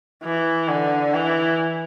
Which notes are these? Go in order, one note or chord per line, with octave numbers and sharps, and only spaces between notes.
E3
D3
E3